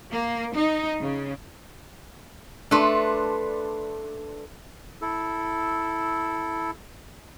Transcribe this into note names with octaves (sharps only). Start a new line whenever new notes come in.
A#3
D#4
C#3
A3 D4 B4 C6
E4 A4